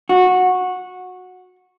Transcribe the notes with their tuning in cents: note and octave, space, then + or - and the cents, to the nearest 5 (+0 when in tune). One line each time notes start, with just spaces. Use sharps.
F#4 -15